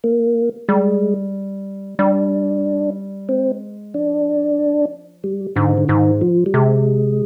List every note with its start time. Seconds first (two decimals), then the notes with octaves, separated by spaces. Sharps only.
0.04 A#3
0.68 G3 G#3
1.99 G3 D4
3.29 G#3 C4
3.94 F3 D4
5.23 G#2 G3
5.56 G#2 D3
5.77 D3
5.89 G#2 D#3
6.21 F3
6.46 G3
6.54 C3 G#3